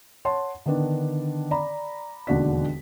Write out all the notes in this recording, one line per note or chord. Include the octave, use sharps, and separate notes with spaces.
C#5 F#5 A5 C6
D3 D#3 B3 D4
D5 A#5 B5
E1 D#2 D3 F#4 D5 B6